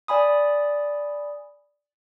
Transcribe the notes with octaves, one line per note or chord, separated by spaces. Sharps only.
D5 G#5 B5 D#6